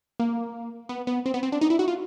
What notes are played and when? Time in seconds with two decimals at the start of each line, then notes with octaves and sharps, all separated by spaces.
0.20 A#3
0.89 B3
1.07 B3
1.26 C4
1.34 B3
1.43 C4
1.52 D4
1.61 D#4
1.70 E4
1.79 F#4
1.88 F4